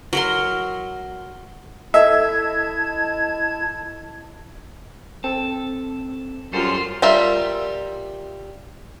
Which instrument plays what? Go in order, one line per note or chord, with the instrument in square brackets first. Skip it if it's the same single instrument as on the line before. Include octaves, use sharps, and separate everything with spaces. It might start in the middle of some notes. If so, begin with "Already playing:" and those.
[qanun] F#3 A#4 C6
[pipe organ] E4 A5 G#6 [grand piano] A4 D#5 [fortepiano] E5
[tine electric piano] C4 [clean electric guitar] A4
[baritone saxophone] F#2 [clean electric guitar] G3 A4 C5 [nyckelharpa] F4 C6
[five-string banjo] G3 F4 A#4 E5